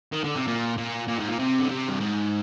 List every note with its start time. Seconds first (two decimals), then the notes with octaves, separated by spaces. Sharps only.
0.12 D#3
0.24 D3
0.36 C3
0.47 A#2
0.78 A#2
1.08 A#2
1.19 G#2
1.28 A#2
1.39 C3
1.60 D3
1.69 C3
1.89 G2
2.00 G#2